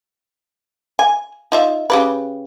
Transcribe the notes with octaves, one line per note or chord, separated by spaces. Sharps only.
G#5
D#4 F4 E5
C#3 G4 B4